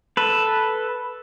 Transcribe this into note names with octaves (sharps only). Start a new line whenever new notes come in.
A4 B4